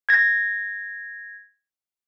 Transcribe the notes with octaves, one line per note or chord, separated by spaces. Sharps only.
G#6 A#6